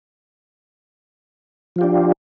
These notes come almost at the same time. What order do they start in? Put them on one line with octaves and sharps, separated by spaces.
F3 F4 G4 D4